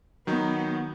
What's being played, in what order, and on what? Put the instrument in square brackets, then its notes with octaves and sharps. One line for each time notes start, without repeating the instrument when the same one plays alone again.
[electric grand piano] D#3 F#3 D#4 [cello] B3